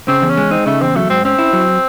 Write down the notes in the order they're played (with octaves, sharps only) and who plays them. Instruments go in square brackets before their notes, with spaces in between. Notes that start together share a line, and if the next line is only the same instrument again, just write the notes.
[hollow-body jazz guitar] C#3 [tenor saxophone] C4
[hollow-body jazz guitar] E2
[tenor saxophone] C#4
[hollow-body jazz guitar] G#3
[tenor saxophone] C4 [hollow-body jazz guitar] D#4
[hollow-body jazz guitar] C#3 [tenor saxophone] A3
[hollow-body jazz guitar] E2 [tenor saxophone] C4
[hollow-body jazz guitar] F#3 [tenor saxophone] A3
[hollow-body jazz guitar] G#2 [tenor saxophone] C4
[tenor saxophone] C4 [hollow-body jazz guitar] C#4
[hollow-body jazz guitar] E4
F#3